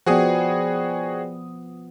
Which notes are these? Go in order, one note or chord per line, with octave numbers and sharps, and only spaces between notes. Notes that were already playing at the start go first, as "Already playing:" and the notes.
F3 B3 F#4 G#4 C5 D5 G5 D#6